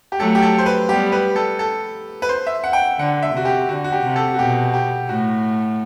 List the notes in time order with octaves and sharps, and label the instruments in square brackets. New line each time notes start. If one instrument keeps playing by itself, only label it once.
[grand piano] G4
[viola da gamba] F#3 A3 [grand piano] A4
[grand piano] G4
A4
C5
B4
[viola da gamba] G3 B3 [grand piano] G4
[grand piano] B4
A4
A4
B4
C5
E5
F#5
G5
F#5
[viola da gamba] D3 [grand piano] F#5
[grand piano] E5
[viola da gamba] C3 [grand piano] F#4
[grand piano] G4
[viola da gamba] D3 [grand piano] F#4
[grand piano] F#4
G4
[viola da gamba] C3
[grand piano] A4
F#4
[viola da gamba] B2 [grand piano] G4
[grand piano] G4
[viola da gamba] A2 [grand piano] F#4